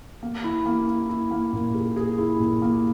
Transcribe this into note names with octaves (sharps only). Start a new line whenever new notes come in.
A#3
E4
A#3
E4
E4
A#3
A#2
G#4
G#4
E4
A#2
A#3